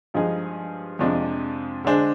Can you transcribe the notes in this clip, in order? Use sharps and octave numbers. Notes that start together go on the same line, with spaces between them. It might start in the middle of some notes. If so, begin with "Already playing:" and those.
G2 F3 G#3 D#4 G#4
F2 C3 F3 G#3 D4
D3 G#3 D4 G#4 C5